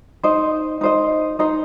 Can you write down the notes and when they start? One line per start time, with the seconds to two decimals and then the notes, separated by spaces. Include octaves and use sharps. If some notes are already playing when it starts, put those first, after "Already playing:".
0.23 D#4 C5 D#5
0.81 D#4 C5 D#5
1.39 D#4 C5 D#5